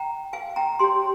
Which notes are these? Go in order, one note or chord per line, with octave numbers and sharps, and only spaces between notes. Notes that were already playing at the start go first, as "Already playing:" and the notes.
Already playing: G5 A#5
F5 G#5
G5 A#5
G4 C#5 G#5 C6